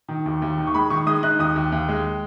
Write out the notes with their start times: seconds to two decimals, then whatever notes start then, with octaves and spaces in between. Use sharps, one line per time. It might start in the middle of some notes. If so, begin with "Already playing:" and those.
0.08 D#3
0.26 D#2
0.42 D#2
0.57 D#3
0.67 C#6
0.75 G#3 B5
0.90 D#3 C#6
1.06 G#3 D#6
1.23 D#4 F#6
1.39 D#2 D#6
1.56 D#2
1.72 D#2
1.88 G#3